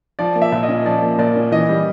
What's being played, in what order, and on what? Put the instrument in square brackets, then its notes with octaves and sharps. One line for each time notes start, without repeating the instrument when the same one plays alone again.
[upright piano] F3 [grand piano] D5
[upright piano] A#3
[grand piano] E5
[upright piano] A#2
[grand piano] D#5
[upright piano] C#4
[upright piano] F3 [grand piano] D5
[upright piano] A#3
[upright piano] A#2 [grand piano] D5
[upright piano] C#4
[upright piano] E3 [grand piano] D#5
[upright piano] G3